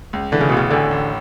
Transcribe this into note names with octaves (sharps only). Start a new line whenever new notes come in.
C#2
D3 E3
C#3
A1 B2
C#3
A2 D3
A1